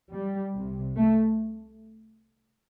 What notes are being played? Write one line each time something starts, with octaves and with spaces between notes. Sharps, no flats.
G3
C2 C3
A3